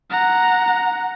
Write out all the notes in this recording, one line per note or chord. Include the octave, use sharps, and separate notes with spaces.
F#5 A#5